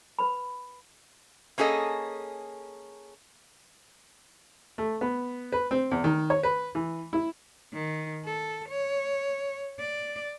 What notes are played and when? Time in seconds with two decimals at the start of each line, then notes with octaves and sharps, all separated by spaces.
0.19 B4 B5
1.58 A#3 C#4 G#4 A4 D#5
4.78 A3
5.01 B3
5.52 B4
5.71 C4
5.91 E2
6.04 D#3
6.30 C#5
6.43 B4
6.75 E3
7.13 E4
7.74 D#3
8.25 A4
8.69 C#5
9.79 D5